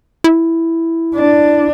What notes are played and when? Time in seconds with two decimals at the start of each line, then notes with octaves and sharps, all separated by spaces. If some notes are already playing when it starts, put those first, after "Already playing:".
0.24 E4
1.16 D4